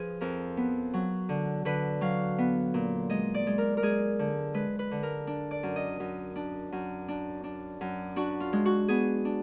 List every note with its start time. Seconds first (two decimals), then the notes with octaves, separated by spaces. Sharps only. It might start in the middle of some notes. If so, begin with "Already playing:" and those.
Already playing: F3 G#4 B4
0.21 F2 A#4
0.57 B3
0.94 F#3
1.29 D3
1.65 D3 B4
2.01 F#3 F5
2.38 B3
2.74 A#2
3.10 G#3 D#5
3.34 D5
3.47 G#3
3.58 A#4
3.77 A#4
3.83 G#3 G#4
4.19 D3
4.54 G#3 B4
4.79 B4
4.91 D3
5.03 A#4
5.27 D4
5.51 D5
5.63 F#2
5.76 D#5
6.00 F#2
6.36 D4
6.72 F#2
7.08 D4
7.44 D4
7.81 F#2
8.16 D4 F#4
8.40 F4
8.53 G#3
8.65 F#4
8.88 B3 G#4
9.25 D4